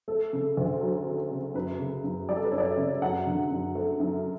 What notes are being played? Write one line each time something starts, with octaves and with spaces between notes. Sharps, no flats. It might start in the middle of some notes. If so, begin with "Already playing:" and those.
A3 A4
C#3
D2
F#3
A3
C#3
F#2 B4
C#3
F#2
G3 D5
A4
B4
F#2 C#5
D5
E5
C#3
F#2 F#5
D3
F#2
A3
F#2